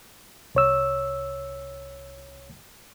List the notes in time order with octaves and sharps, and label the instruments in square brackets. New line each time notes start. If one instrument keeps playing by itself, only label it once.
[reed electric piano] C2 C#5 E6